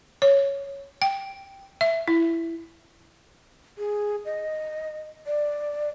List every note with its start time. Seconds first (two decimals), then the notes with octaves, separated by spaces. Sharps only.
0.22 C#5
1.02 G5
1.81 E5
2.08 E4
3.78 G#4
4.25 D#5
5.27 D5